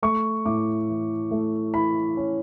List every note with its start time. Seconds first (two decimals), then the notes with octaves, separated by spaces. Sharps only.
0.02 A3 C#6
0.46 A2 D6
0.88 E3
1.31 A3
1.74 E3 B5
2.17 C#4